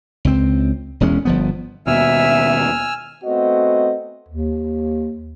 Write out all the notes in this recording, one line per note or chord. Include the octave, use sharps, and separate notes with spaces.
C#2 C4
E1 E2 G#3 C#4
G1 F3 B3
D#2 B2 E5 G#5 E6 F6
A3 B3 C4 F#4 D#5
D#2